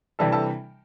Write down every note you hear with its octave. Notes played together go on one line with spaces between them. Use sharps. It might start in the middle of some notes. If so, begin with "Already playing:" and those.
C3 E3 G3 D4 A4 A5
A4 A5